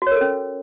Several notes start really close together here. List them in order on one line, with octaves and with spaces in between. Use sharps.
F#4 C#5 A#4 A4 C#4